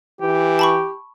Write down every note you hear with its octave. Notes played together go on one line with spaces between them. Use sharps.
E3 G4
A5 B5 C#6